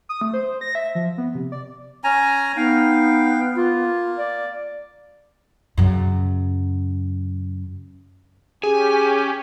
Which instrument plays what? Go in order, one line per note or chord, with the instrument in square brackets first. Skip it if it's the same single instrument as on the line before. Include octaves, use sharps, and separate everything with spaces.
[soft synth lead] D#6
A3
C5
A#6
E5
F3
B3
C3
D5
[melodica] C#4 G#5 A#5
[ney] B3 [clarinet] D#4 [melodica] F5 G5
[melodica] A#3 [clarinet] F4
[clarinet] D5
[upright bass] F#2 C#3
[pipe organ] C#4 G4 [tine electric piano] G#4 [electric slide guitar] G#5